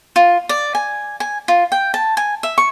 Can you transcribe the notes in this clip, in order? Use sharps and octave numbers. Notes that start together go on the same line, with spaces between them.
F4
D5
G#5
G#5
F4
G5
A5
G#5
E5
C#6